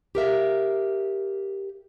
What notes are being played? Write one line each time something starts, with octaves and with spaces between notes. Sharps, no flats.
G4 A#4 E5 F5